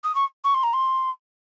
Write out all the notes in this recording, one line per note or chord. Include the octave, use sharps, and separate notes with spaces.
D#6
C#6
C#6
C6
A#5
C6